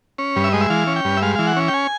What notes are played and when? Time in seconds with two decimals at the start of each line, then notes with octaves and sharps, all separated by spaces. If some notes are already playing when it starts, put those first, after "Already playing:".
0.18 C#4
0.36 G2
0.44 E5
0.53 G#3 D#5
0.61 E5
0.70 E3 F5
0.87 C#4
0.96 G5
1.05 G2
1.17 E5
1.22 G#3 F5
1.36 E3 F5
1.47 F#5
1.57 C#4
1.68 G5
1.74 G#5